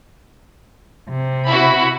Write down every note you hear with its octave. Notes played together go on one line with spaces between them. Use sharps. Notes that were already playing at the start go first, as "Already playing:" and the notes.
C3
E4 F#4 B5